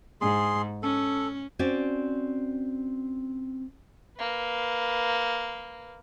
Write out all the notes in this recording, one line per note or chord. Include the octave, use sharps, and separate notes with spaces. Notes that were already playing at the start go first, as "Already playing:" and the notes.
G#2 G#4 C6
C#4 A4
C4 C#4 F#4 D5
A#3 B4